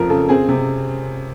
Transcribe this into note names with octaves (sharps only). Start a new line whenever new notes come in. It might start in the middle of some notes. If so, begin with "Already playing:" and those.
Already playing: F2 F3 A3 A#4
C#3 A4
C4 G#4
C3